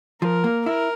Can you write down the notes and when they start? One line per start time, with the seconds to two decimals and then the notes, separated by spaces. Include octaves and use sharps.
0.21 F3 A#4
0.44 A#3
0.66 E4 A#4